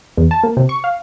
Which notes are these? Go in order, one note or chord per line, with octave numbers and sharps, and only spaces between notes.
E2
A5
A#3
C3
C#6
F5